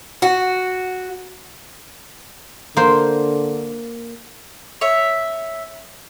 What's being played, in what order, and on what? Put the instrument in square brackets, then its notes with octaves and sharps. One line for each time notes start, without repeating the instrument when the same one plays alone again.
[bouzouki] F#4
[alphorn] D3 [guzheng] A#3 C5
[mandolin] C#5 E5